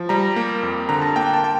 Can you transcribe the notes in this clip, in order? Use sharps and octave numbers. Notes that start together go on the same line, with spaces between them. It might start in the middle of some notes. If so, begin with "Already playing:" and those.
Already playing: F3
G3 A#5
A#3
F2
D3 A#5
A5
A#3 G5
A5
G5